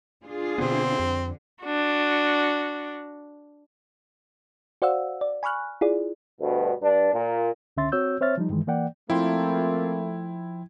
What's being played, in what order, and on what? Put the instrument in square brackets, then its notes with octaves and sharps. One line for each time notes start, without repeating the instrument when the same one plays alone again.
[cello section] D4 F4 G#4
[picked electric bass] B2 D3 B3 [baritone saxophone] C4
[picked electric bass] F2 [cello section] D3
[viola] D4 F#4
[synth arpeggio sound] F#4 C5 D5 F5 F#5 E6
D5
G#5 B5 C#6 F6 F#6
E4 F4 G#4 D5
[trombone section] D2 G2 B2
G2 D4
A#2
[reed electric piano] C#2 D3 C#4 E5 C6 A6
C4 F#4 C#5 E6 G6
C4 C5 C#5 E5 F6 A6
F3 G3 D#4
G2 D#3 E3 G#3
E3 A#3 D5 F#5 G5
[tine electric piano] F3 G5 C6 [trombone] A3 [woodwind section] A#3 C4 F4 [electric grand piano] E4